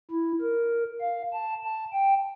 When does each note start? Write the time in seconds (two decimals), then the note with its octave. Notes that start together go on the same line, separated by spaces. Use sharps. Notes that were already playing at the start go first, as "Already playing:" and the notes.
0.11 E4
0.41 A#4
1.01 F5
1.33 A5
1.63 A5
1.93 G5